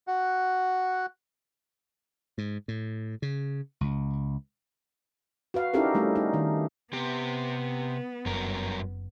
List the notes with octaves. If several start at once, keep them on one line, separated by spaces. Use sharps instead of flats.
F#4 F#5
G#2
A2
C#3
C#2
F#4 B4 F5
C#4 D#4 E4 G4 A4 A#4
G3 A3 D4
D#4
D#3
C3 B3 G4
F#1 G2 F#3 A#4